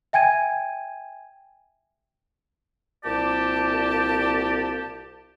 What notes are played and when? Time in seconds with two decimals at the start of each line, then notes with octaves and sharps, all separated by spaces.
0.13 E5 G5 G#5 G#6 D#7
3.04 C2 A#2 G4 D5 A5